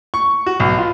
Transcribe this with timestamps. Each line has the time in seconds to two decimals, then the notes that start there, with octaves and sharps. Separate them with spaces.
0.14 C#6
0.46 F#4
0.60 B1
0.78 F4